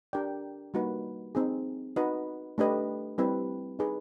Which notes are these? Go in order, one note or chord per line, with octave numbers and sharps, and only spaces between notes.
D4 G4 A#4 D5 G5
G3 A#3 D#4 F#4 B4
C4 D#4 G#4
D#4 F#4 B4 D#5 F#5
A3 D4 G4 B4 D#5
G3 C4 E4 G4 B4
D#4 G#4 B4